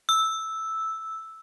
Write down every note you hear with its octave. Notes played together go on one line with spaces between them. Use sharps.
E6